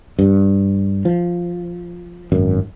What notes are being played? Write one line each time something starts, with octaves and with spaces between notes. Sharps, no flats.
G2
F3
G#1 F#2